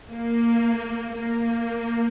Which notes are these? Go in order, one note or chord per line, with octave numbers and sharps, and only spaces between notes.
A#3
A#3